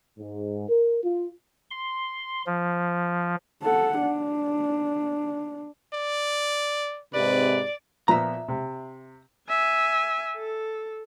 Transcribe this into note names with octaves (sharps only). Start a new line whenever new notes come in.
G#2
A#4
F4
C6
F3
A4 F#5
D4
D5
G#2 C3 B4 D5
A#2 F3 B3 E5 A#5
C3
E5 G#5
A4